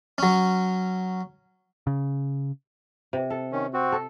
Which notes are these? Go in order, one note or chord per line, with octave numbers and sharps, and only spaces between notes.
F#3 C#4
C#3
C3
A4
D#3 C#4
C4 F#4
A4